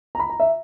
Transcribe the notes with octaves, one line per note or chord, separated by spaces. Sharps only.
A#5
B5
A#5
E5